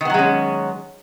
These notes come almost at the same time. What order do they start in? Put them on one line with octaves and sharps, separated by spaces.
D#3 B3 F#3 G#3 C#4